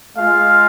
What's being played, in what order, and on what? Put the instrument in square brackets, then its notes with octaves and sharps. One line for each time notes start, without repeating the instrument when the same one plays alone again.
[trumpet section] G#3 F4 F5